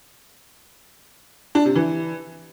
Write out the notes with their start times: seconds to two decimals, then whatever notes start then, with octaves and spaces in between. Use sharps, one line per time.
1.55 D4
1.65 C3
1.75 E3